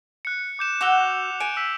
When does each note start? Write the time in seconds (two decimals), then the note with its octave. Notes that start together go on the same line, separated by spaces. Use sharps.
0.25 F#6 C#7
0.59 D6 G6 E7
0.81 F#4 D6 E6 F7 G7
1.40 G#5 D7
1.57 E6 B6